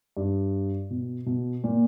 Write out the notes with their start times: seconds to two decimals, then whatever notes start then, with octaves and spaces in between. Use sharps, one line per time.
0.17 G2
0.90 B2
1.26 B2
1.64 A#2